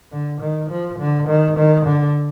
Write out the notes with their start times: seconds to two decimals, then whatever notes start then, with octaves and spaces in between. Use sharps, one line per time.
0.12 D3
0.41 D#3
0.70 F3
0.99 D3
1.27 D#3
1.57 D#3
1.86 D3